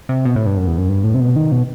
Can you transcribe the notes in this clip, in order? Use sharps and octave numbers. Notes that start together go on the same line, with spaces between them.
C3
B2
A2
G2
F#2
E2
F#2
G2
A2
C3
B2
D#3
B2